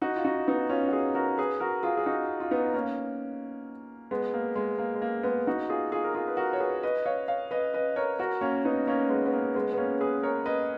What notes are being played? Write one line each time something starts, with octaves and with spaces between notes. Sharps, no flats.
D#4 F#4
F4
D#4 F#4
B3 D#4
C#4 F4
F#4
F4 G#4
F#4 A#4
G#4 B4
F#4 A#4
F4 G#4
G#4
D#4 F#4
F4
B3 D#4
A#3 C#4
G#3 B3
A#3
G#3
A#3
G#3
A#3
G#3 B3
D#4 F#4
F4 G#4
F4 G#4
A#4
F4 G#4
B4
F#4 A#4
C#5
G#4 B4
B4 D#5
C#5 F5
C#5 F5
B4 D#5
B4 D#5
A#4 C#5
F#4 A#4
A#3 C#4
B3 D#4
A#3 C#4
G#3 B3
B3
A#3
G#3 B3
B3
A#3 C#4
G#4 B4
A#4 C#5
B4 D#5